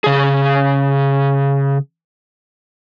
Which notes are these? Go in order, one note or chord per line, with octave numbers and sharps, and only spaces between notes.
C#3 G#4